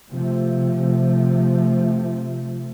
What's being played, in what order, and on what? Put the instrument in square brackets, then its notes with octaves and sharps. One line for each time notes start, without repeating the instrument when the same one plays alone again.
[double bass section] C3 F3 A3